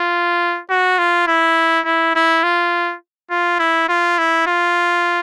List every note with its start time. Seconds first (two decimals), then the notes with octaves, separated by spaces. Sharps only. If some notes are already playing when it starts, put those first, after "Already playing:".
Already playing: F4
0.70 F#4
0.98 F4
1.28 E4
1.85 E4
2.15 E4
2.43 F4
3.31 F4
3.59 E4
3.89 F4
4.18 E4
4.47 F4